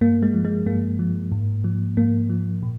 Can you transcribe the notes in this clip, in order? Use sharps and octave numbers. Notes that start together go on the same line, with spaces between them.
G2 A#3
G#3
F3
G#3
G2 A#3
F3
G#2
F3
G#2 A#3
F3
A#2